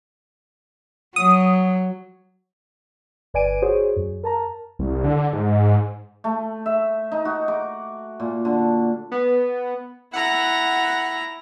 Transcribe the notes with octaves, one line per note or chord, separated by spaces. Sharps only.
F#3 D#6
G1 B4 D5 G#5 D7 D#7
F#4 G#4 C5 C#5
F#2
A#4 A5 A#5
C2
D3
G#2
A3
E5
D#4
F#4
D6
A#2
D3
B3
E4 F#5 A#5